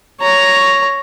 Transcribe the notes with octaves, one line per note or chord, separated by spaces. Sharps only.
C#5 A#5